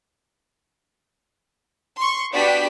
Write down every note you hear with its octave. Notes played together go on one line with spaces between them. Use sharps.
C6 C#6
B3 D4 F#4 G4 B6